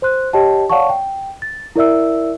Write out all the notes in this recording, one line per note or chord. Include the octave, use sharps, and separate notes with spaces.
C5 C6 F#6
G4 C#5 D#5 G5 A5
C#5 D5 F5 F#5 A5 C#6
G5
A6
E4 A#4 D5 E5 E6